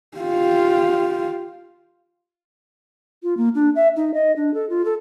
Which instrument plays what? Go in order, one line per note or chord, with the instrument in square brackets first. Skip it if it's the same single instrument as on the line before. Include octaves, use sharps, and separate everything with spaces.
[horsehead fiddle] F4 G4
[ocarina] F4
A#3
D4
E5
D#4
D#5
D4
A4
F4
A4